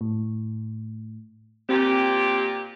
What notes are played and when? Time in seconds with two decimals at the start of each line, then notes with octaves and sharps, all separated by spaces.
0.01 A2
1.69 A#2 C4 G4